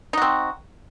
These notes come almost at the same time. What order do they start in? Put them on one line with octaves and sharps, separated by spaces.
D#4 F#4 C4